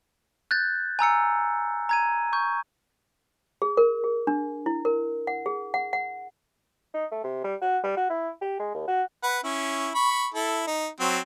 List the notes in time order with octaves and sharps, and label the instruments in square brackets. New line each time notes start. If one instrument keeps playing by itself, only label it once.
[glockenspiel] F#6 G6 A6
G#5 A#5 E6 C#7
A#5 G#6 D#7
C#6 G6
[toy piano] G#4
A#4
G#4
D4
E4
A#4
F#5
G#4
F#5
F#5
[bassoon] D#4
A3
C3
G3
F#4
G3
F#4
E4
G4
G#3
D#2
F#4
[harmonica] B4 F#5
C#4 E4
B5 C#6
E4 A4
D#4
F#3 C4